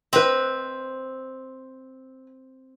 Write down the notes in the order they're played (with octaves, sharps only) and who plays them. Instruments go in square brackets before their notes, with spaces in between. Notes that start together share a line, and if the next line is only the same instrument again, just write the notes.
[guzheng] C4 [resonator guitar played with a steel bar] B4 D#5